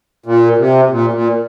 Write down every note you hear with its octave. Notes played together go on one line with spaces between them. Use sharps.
A#2
C3
A#2
A#2